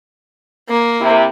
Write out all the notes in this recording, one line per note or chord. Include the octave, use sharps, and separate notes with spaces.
A#3
C3 E4